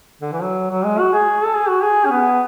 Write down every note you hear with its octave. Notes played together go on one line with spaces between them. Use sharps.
D3
E3
F#3
F#3
G#3
F#4
G#4
A4
G#4
F#4
G#4
C#4
B3